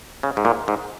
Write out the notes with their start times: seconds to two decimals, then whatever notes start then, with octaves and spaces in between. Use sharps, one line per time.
0.23 C#3
0.37 G#2
0.45 A#2
0.68 G#2